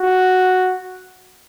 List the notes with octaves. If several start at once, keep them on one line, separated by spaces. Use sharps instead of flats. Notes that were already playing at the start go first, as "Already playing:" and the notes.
Already playing: F#4